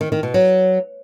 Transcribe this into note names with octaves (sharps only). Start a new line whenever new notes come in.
D#3
D#3
B2
F#3